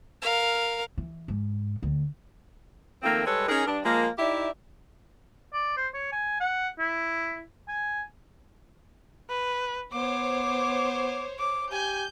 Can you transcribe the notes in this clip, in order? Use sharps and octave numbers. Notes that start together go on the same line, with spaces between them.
A#4 F5
E3
G#2
D2
D#3 F3 A3 A#3 C4
G3 G#3 A4 B4 C#5
C#4 D#4 G#4 A#4
G2 D4
F3 G#3 A#3
D#4 E4 G4 D5 E5
D5
C5
C#5
G#5
F#5
E4
G#5
B4
B3 C5 C#5 D6
D6
G4 G#5 G6